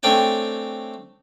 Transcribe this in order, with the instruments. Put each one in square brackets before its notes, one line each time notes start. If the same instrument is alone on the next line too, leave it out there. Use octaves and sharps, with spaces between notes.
[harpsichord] A3 C4 D4 C#5 G5 G#5